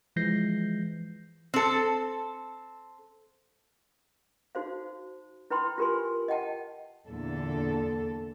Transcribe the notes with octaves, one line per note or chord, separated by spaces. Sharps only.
E3 F3 G#3 G6 A#6 C7
C4 A4
D#4 F#4 C5 F5
E4 B4 G5 B5 C6
F4 G4 A#4 B4 G#5 C6
D#5 F#5 G5 A5
E2 A#2 D3 A4